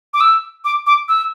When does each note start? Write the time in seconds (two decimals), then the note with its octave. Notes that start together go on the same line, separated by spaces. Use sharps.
0.14 D6
0.21 E6
0.65 D6
0.86 D6
1.08 E6